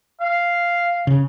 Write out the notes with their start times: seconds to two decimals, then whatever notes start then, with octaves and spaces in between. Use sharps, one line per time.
0.21 F5
1.07 C#3